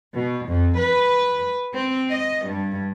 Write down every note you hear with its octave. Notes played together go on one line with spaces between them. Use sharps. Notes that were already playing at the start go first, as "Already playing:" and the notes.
B2
F2
B4
C4
D#5
G2